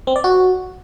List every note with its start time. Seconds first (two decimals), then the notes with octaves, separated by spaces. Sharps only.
0.07 C4
0.16 D5
0.24 F#4